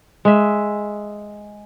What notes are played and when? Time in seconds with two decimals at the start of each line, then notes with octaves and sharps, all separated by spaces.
0.25 G#3 E5